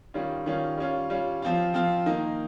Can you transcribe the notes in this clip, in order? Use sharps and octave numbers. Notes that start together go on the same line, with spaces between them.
D#3 G3 C#4 F4
D#3 G3 C#4 F4
G3 C#4 F4
G3 C#4 F4
F3 C4 F4
F3 C4 F4
D#3 A#3 D#4